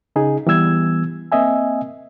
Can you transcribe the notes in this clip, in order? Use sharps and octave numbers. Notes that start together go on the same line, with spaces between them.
C#3 D#4 G#4
E3 G3 B3 E6 G#6
A#3 C4 D#5 E5 G#5